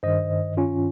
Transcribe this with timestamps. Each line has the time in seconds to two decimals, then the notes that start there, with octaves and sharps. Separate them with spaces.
0.03 G2 D#3 C5 D#5
0.57 C#4 F4